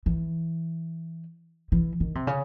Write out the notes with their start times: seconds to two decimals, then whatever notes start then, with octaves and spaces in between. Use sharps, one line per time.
0.06 E3
1.72 E3
2.00 D#3
2.15 C3
2.27 C#3